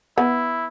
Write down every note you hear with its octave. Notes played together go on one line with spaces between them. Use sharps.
B3 E4